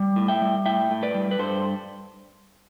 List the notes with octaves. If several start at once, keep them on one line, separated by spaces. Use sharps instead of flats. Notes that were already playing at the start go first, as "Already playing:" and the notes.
Already playing: G3
A2
E5 G5
G3
A2 E5 G5
A2
B4 D5
G3
B4
G2 A4 C5